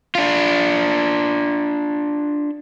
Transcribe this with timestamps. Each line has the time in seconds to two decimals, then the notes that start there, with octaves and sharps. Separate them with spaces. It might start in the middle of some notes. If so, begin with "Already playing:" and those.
0.15 D4 F4